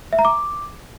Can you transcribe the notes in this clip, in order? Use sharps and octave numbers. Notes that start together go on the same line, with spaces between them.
E5
A#5
D6